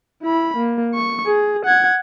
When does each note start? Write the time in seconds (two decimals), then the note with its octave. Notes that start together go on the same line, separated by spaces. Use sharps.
0.23 E4 B5
0.57 A#3
0.94 C#6
1.26 G#4
1.65 F#5 G#6